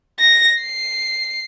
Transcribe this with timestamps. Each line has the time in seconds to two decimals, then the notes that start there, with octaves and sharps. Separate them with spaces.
0.19 A#6
0.62 C7